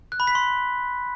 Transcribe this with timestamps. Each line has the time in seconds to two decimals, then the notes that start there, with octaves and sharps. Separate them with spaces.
0.12 F#6
0.20 B5
0.27 B6
0.35 C6